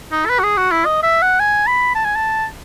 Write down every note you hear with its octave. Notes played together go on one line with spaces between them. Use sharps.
D#4
A4
B4
F#4
G#4
F#4
E4
D#5
E5
F#5
G#5
B5
A5
G#5
A5